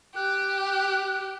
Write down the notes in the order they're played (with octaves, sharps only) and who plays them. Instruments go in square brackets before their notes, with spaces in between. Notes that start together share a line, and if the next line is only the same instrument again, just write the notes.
[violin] G4 [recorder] F#6